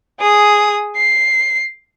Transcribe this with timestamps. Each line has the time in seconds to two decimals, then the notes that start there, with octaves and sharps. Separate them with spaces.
0.20 G#4 D#6
0.96 C7